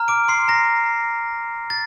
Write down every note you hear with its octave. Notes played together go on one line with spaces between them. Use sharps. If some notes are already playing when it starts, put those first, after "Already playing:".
Already playing: A#5 F6
D6 D7
C6 C7
A#5 A#6
A6